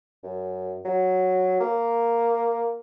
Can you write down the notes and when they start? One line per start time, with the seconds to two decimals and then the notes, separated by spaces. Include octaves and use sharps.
0.24 F#2
0.85 F#3
1.61 A#3